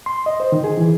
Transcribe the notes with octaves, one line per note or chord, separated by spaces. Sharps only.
C6
D#5
C5
D#3
G#4
E3